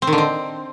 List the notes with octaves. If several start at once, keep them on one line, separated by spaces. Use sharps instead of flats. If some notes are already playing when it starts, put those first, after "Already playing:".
C4
D#3
D3
C4